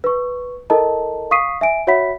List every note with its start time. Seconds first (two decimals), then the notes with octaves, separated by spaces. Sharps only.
0.04 B4 C#6
0.70 E4 A4 A#4 D#5 A5 A#5
1.31 F5 C#6 D#6 B6 C7 D#7
1.61 E5 G#5 D7
1.87 F#4 C#5 E5 F#5 B5 B6